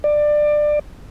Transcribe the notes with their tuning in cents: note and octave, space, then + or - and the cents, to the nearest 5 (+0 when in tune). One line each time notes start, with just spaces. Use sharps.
D5 +20